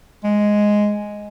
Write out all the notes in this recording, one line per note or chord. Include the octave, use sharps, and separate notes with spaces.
G#3